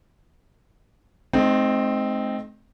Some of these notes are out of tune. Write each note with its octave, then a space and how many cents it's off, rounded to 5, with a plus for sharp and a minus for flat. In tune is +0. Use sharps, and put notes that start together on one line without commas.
A3 -45 C4 +0 D#4 +0